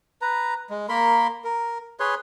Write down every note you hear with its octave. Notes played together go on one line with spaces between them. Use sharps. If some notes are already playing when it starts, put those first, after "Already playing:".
B4 A#5
G#3
A#3 A#4 B5 C6
A#4
G#4 B4 C#5 C6